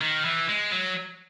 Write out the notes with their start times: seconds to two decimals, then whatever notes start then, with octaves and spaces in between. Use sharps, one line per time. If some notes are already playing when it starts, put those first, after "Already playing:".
0.01 D#3
0.25 E3
0.49 G#3
0.72 F#3